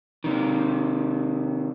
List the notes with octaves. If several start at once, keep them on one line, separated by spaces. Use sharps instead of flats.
C3 D#3